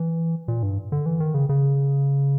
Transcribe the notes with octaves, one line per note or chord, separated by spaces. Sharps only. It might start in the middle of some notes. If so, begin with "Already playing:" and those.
Already playing: E3
A#2
G2
D3
E3
D#3
C#3
C#3